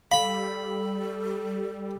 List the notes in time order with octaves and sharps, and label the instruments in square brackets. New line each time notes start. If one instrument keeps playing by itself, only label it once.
[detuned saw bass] G3 [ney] A4 [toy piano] F5 [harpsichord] B5